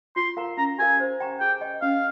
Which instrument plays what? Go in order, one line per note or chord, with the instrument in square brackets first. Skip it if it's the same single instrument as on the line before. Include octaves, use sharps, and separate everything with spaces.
[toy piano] F4 [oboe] C6
[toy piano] A#4 F5 A#5
[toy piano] C#4 [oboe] A#5
[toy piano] G4 A#4 F5 [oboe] G#5
[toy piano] C5
G5 A#5 C#6
[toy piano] G#4 [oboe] G5
[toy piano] D#5 G5
[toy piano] C#4 [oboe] F5